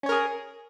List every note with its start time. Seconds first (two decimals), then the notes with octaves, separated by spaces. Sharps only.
0.03 C#4
0.06 C#5
0.09 A#4
0.12 G#4